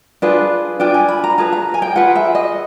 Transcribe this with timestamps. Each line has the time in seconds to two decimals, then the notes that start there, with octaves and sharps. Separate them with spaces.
0.22 D4 F4 G#4 B4
0.80 D4 F4 G5
0.94 G#5
1.08 B5
1.24 A#5
1.38 F4 G#4 B4 A5
1.53 A#5
1.74 G#5
1.82 G5
1.96 F4 G#4 B4 F#5
2.15 E5
2.35 D#5